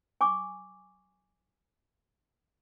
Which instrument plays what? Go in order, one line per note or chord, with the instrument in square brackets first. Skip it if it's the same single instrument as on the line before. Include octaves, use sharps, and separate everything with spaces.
[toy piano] G#5 C#6 D6